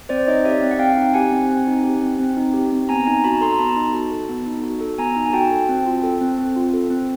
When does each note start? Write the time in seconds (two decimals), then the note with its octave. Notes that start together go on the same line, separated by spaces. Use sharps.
0.09 C4 C5 D5
0.27 D#4 C#5 D#5
0.44 G4 D5 E5
0.62 C4
0.71 F#5
0.79 C4 F5 G5
0.97 D#4
1.14 G4 F#5 G#5
1.32 C4
1.49 C4
1.67 D#4
1.84 G4
2.02 C4
2.19 C4
2.37 D#4
2.54 G4
2.72 C4
2.89 B3 G#5 A#5
3.06 D#4 G#5 A#5
3.24 F#4 A5 B5
3.41 A4 A#5 C6
3.52 A#5
3.58 B3 A5 B5
3.76 D#4
3.93 F#4
4.11 A4
4.29 B3
4.46 D#4
4.63 F#4
4.81 A4
4.98 B3 G#5 A#5
5.16 D#4
5.26 G#5
5.33 F#4 G5 A5
5.51 A4
5.69 C4
5.86 F4
6.03 A4
6.21 C4
6.39 C4
6.56 F4
6.73 A4
6.90 C4